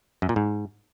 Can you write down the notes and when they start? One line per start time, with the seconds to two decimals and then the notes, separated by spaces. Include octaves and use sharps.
0.22 F#2
0.29 A#2
0.36 G#2